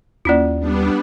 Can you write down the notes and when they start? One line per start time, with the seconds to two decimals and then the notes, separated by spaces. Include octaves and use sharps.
0.25 D#2 A#3 C#4 E4 F4 D5
0.59 G3 B3 D4